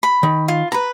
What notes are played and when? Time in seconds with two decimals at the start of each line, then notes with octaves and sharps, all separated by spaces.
0.03 B5
0.23 D#3
0.48 F4
0.72 B4 A#5 B5